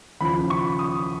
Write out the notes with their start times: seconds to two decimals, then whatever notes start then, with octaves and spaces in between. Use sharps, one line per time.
0.21 D#2 C#3 F3 B5
0.50 C#6
0.79 D#6